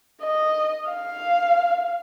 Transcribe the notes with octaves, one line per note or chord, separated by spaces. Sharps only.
D#5
F5